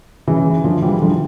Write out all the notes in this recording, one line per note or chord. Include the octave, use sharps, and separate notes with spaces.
C#3 E3
D3 F3
E3 G3
D3 F3